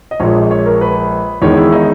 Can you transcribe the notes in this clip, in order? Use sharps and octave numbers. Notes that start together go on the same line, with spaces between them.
D#5
A#1 A#2 G#3 C#5
C#5
A#4
B4
E2 D#3 G#3 C#5
E4
D#4